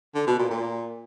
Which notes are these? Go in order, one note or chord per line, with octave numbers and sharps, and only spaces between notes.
D3
B2
A#2
A#2